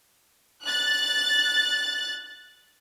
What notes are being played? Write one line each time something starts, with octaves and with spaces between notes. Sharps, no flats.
F#6 A6